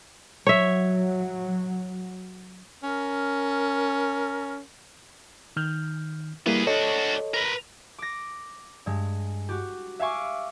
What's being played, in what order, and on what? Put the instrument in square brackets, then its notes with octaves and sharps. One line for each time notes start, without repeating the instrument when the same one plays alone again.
[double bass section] F#3 [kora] C#5 E5
[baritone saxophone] C#4 [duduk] A#4
[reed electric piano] D#3 F6 G6
[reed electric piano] G3 A#3 E4 [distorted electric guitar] B3 G#4
[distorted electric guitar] D4 F#4 [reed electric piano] A4 C#5 D#5
[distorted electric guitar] A#4 B4
[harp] D6 A#6
G2 G#3
F#4 G4
E5 F5 G#5 C#6 D6